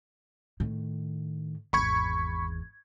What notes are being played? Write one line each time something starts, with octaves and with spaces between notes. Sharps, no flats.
A2 D#3
G#1 E2 B5 C#6 G#6